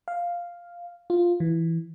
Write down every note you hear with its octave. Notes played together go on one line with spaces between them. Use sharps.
F5
F4
E3